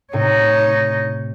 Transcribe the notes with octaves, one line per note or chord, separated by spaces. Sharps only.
A2 C3 D#4 C#5